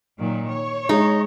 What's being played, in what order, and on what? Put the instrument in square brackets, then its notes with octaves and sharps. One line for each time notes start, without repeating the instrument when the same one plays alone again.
[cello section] A#2 D#3 F#3
C#5
[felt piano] G#3 [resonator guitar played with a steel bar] D#4